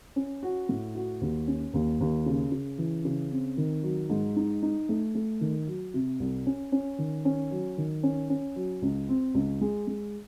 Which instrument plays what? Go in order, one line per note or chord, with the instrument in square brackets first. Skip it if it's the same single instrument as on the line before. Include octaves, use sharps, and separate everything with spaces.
[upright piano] C#4
F#4
A2
F#4
D#2
C#4
D#2
D#2
C#3
C#3
E3
C#3
C4
D#3
F#3
G#2
D#4
D#4
A3
A3
D#3
F#3
C3
C2
C#4
C#4
D#3
C#4
F#3
D#3
C#4
C#4
F#3
C#2
C4
C#2
G#3
G#3